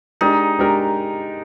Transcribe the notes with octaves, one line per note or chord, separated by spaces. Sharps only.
G#3 D4 D#4 G4 A#4
G#3 D4 G4 A#4